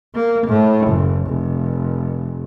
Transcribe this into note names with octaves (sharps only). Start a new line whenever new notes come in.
A#3
A2
F#1
F1